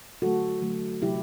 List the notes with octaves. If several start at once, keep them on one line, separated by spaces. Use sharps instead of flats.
D3 F#3 A3 F#4 A4
D3 F#3 A3
C3 F#3 A3 E4 G4